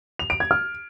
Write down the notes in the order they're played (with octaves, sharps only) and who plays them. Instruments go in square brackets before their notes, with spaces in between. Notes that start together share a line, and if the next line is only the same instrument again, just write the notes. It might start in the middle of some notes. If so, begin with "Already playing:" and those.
[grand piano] F7
D7
G#6
F6